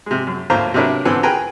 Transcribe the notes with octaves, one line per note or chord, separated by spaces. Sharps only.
C3 G#3
F#2
D2 A2 A#3 F4 C5 A#5
C3 F#3 D4 E4 A#4 B4
D3 E3 B3 C4 G#5
G#4 A#4 B4 G5 G#5 A#5